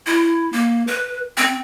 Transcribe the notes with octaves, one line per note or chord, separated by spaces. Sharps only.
E4
A#3
B4
C4